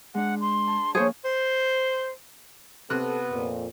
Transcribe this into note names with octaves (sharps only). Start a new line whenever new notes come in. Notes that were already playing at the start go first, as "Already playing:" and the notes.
G#3 D4 F#5
C6
A5
F3 A#3 G#4 C5 C#5
C5
C3 B3 A4 F#6
F2 A#2